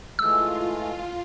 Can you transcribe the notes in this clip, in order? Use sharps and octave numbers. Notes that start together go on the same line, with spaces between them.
E3 G#3 A3 F4 E6